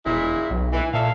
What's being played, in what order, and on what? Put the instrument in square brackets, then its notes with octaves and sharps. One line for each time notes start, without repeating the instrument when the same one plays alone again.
[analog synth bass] E1 [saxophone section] A#2 G#3 E4
[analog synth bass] B1
[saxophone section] E3
[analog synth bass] A#2 [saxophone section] A4 E5 F5